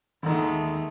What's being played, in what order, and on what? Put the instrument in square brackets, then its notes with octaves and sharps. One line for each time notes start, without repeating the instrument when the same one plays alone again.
[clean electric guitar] D#2 B5 [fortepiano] D3 D#3 [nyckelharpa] G#3 A3